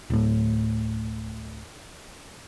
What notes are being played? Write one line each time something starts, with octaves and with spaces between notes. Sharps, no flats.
D1 A2